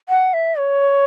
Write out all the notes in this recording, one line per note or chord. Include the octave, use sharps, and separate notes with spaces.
F#5
E5
C#5